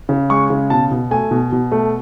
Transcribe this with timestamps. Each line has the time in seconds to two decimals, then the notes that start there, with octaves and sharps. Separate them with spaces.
0.09 C#3
0.30 G#3 C#6
0.50 C#3
0.70 B2 A5
0.91 B2
1.11 A3 G#5
1.31 B2
1.52 B2
1.72 A3